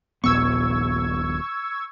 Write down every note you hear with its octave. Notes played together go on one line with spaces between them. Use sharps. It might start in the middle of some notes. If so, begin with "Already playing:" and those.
D#1 A#1 B3 C#6 E6 G#6